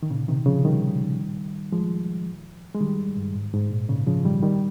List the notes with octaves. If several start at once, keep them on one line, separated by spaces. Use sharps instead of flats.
D#3
A#2 C#3
C3 D#3
C#3 F3
D#3 G3
F3 G#3
G#3
D#3 G3
G2
G#2
G#2
A#2
A#2 C#3
C#3 F3
D#3 G3
D#3 G3